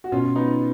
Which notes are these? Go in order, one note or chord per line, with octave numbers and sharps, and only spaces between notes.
F#4
B2 C#4 F4
B3 D#4